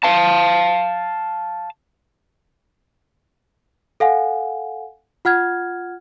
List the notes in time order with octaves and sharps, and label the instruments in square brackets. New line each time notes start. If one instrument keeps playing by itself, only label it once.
[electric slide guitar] F5 A5
[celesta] A4 F5 F#5 G#5
F4 F#5 F6 G#6